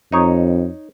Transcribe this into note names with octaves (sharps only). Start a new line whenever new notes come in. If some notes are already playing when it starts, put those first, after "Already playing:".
F2 D#4 C#5